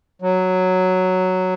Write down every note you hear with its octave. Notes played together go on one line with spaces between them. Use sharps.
F#3